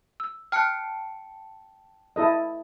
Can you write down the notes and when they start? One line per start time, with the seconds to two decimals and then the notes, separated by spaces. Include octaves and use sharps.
0.20 E6
0.52 G5 A5 F6 F#6 C#7
2.16 E4 A4 D#5